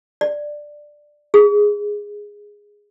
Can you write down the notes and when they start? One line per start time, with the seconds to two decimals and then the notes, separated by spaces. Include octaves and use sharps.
0.21 D5
1.34 G#4